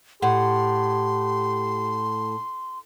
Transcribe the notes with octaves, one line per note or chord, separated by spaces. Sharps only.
A2 G4 F#5 C6